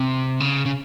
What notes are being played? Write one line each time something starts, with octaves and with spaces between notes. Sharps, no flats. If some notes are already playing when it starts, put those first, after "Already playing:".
Already playing: C3
C#3
C#3